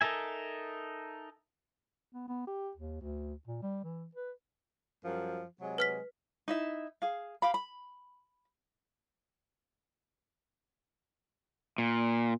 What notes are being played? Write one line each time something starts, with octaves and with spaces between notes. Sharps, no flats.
D#4 A4 A#4 E5 G#5
B3
B3
G4
D#2
D2
A#2
G3
E3
B4
F#2 F3 G3
C3 F#3 G#3
B4 F6 B6
D#4 E4 E5
G#4 F5
G4 F5 B5
B5
A#2